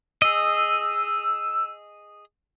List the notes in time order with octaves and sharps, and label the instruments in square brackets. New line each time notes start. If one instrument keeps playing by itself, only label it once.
[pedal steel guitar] G#4 D#5 [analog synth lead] E6